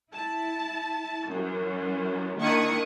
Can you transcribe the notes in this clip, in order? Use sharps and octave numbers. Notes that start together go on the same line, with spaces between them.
E4 A5
F#2 E3
D#3 A#3 D4 E4 C#6 D#6